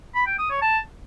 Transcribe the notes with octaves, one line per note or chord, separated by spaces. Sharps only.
B5
G5
D#6
C#5
A5